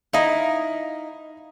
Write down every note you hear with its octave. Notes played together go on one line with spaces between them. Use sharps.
D#4 E4 D#5 F5